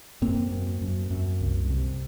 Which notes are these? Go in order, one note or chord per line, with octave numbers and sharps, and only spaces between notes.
F#2 A#3 C4
F#2
F#2
F#2
C2
C3